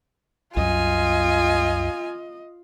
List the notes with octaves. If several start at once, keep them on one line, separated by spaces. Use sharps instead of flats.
C2 F#2 F#3 F4 D#5 G#5